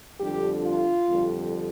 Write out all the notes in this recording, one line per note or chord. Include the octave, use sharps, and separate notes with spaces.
F2 D3 G3 D4 G4
F4
F2 D3 G3